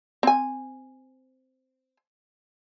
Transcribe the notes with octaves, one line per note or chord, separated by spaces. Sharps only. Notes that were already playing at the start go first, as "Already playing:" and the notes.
C4 G#5